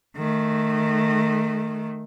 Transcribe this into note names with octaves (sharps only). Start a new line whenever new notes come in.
D#3 A3